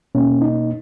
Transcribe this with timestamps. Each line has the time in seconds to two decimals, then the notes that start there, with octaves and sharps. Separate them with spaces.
0.15 B2 A#3 C#4
0.42 D#4